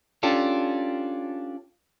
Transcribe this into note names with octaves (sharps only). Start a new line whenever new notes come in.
C#4 D4 F4 G4 A4